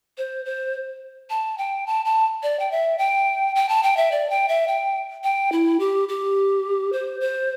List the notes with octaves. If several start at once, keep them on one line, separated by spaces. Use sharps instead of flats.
C5
C5
A5
G5
A5
A5
D5
G5
E5
G5
G5
A5
G5
E5
D5
G5
E5
G5
G5
E4
G4
G4
C5
C5